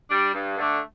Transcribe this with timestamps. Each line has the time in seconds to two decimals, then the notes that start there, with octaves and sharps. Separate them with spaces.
0.11 G3 D4
0.34 G2
0.58 D3 A3 D4